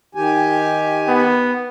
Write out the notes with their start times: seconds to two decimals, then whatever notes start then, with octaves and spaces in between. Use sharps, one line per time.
0.15 D#3 G4 G#5
1.08 B3